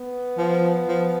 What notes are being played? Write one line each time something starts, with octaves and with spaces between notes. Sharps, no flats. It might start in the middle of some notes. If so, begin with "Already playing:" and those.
Already playing: B3
F3
F3